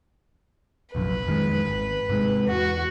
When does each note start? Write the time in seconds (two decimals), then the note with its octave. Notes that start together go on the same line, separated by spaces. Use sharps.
0.95 F1 A#1 F#2 B4
1.27 F2 D#3 G#3
1.66 G#1
2.10 G#2 C3 G#3
2.47 E2 F#4